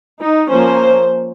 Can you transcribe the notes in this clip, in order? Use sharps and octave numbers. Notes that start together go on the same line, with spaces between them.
D#4
F3 A#3 C#4 C5